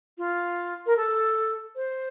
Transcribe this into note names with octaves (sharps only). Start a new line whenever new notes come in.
F4
A#4
A4
C5